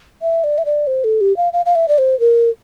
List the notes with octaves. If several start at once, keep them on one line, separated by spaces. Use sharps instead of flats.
E5
D5
E5
D5
C5
A4
G4
F5
F5
F5
E5
D5
C5
A#4